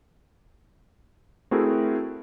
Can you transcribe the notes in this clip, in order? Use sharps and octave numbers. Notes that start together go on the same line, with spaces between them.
A3 C4 E4 F#4 G#4 A#4